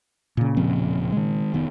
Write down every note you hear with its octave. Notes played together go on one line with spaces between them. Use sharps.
A#2 C#3
E1 F3 C4
D#3 G#3
F1 D#3 B3